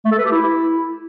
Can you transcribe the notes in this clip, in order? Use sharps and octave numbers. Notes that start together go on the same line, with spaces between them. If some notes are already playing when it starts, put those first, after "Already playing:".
A3
A4
B4
G4
E4